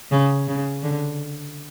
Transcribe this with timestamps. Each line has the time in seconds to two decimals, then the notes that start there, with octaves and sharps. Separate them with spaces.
0.11 C#3
0.48 C#3
0.83 D3